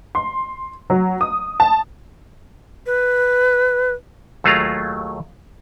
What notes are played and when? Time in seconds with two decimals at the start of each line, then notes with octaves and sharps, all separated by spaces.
0.15 C6
0.90 F#3
1.21 D#6
1.60 A5
2.86 B4
4.44 D#2 F#3 A3 F4 G#4 A#5